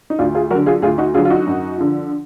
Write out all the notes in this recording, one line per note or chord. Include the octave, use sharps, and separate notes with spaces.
D#4
D2 D4 F4
F4 G#4
D3 F#3 F#4 A#4
F4 G#4
D2 F4 G#4
D#4 F#4
D3 F#3 F4 G#4
F4
D#4 F#4
F#2
D3 F3